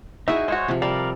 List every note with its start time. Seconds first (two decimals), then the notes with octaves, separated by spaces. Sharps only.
0.28 D#4 E4 F#4 G#4 E5
0.48 G#3 F#4 C5 C#5
0.68 C3 F3
0.82 G3 A4 A#4 D5 F5